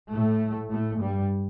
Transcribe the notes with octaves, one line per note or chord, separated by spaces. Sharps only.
A2 A3
A2 A3
G2 G3